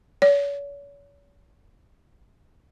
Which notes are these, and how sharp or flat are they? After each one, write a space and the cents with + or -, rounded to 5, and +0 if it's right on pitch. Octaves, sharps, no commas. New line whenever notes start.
C#5 +40